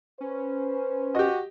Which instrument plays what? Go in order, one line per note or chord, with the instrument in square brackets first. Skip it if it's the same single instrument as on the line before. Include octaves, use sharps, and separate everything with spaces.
[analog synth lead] C#4 [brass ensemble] B4 C5
[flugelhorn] F#4 [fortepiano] G4 D#5